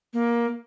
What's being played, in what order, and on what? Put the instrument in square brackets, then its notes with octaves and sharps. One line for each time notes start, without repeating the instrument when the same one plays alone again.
[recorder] A#3